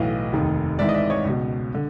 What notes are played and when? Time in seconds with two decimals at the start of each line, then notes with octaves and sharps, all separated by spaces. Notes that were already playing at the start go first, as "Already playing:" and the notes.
Already playing: B1 A2 E3 D#5 F5
0.33 F1 D#2 D#3
0.79 G#1 G#2 E3 D5 E5
0.89 D#5
0.94 D5 E5
1.10 C#5 D#5
1.24 C#2
1.29 B2
1.74 D3